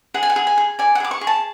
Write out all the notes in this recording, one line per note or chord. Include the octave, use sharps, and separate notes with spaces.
G#4 F#5
G#5
F#5
G#4
G#5
G#4
D5 G#5
F#5
G#4 D6
C#6
G#4
A5